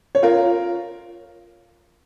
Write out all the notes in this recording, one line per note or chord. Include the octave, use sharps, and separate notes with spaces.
C#5
F4 A#4